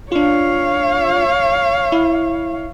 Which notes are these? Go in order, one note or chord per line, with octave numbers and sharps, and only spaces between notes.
D4 F4 C#5 F5
E4